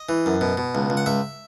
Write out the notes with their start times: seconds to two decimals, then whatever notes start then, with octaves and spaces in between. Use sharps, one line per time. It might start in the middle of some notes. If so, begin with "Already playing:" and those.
Already playing: D#5
0.09 E3
0.26 F#2
0.41 B2
0.57 B2
0.75 C#2
0.90 C#2
0.97 F#5
1.06 C#2 E5